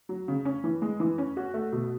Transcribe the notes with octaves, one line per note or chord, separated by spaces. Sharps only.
F#3
C#3
C#4
E3
G#3
E3
C#4
F#4
A3
B2